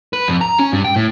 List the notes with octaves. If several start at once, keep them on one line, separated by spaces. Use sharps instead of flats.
B4
F2
A#5
C#4
G2
G5
A2